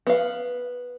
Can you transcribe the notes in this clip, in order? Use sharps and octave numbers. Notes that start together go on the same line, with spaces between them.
B3 F5